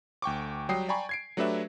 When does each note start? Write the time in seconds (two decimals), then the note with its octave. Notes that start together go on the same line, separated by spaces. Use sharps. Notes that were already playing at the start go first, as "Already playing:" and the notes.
0.22 D2 G5 C#6 D6
0.69 F#3 G3 G5 D#6 C7
0.89 D5 G5 G#5 A#5 B5 C#6
1.09 G#6 C7 D7
1.37 F#3 A3 D4 G4 B4 E5